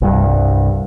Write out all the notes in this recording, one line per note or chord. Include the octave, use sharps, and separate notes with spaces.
C2 G2